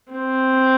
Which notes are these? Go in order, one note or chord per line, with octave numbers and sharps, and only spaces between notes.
C4